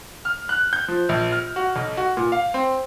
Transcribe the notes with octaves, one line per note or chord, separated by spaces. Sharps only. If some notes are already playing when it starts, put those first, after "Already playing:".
F6
F#6
G6
F3
A#1
F6
F#4
B1
F#4
A#2
F5
C4